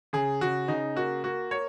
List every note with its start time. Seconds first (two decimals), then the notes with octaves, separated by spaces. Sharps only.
0.13 C#3 G#4
0.41 C#3 F#4
0.68 C#3 D#4
0.96 A#3 F#4
1.24 A#3 F#4
1.51 A#3 C#5